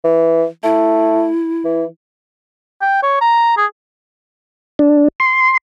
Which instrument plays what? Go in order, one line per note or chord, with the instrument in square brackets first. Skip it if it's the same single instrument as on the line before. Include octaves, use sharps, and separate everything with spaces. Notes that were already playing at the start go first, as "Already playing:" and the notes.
[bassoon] E3
[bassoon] A3 [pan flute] E4
[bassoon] E3
[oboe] G5
C#5
A#5
G#4
[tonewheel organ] D4
C6